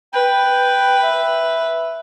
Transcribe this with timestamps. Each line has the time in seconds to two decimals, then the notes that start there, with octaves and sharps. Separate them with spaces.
0.14 B4 G5
1.03 E5